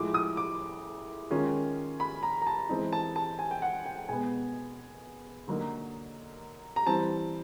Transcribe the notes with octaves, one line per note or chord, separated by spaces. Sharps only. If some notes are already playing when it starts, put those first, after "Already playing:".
Already playing: A2 F3 G#3 D6
D#6
D6
D#3 G#3 C#4 F4
B5
A#5
A#5
A5
E3 G#3 C4 D#4
A5
A5
G#5
G5
F#5
G5
B2 G#3 B3 G#5
D3 F#3 A#3 D#4
A#5
E3 G3 C4 A5